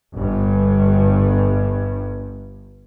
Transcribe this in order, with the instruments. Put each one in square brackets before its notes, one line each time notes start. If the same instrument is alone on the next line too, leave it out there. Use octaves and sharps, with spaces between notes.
[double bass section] G1 G2